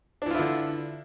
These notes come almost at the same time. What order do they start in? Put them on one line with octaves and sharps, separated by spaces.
D4 E3 F4 E4 D3